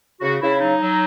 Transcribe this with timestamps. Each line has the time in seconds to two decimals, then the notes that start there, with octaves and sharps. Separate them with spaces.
0.21 C#3 F#4
0.41 C#3 E4
0.60 F#3 D#4
0.80 F#3